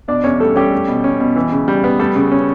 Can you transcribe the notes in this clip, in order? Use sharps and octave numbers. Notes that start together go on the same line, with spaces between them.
B2 D4 D5
E2 C#4 C#5
G3 A3 A4
G3 C#4 G4
A3
B2
C#4
B2
E3
C#3
G3
B3
G3 A3 A4
C#3
C#4